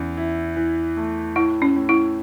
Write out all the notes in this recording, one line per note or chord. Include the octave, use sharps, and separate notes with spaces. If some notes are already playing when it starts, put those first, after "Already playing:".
Already playing: E2 C#4
E4
E3
A3
A2 E4
C#4
A2
E4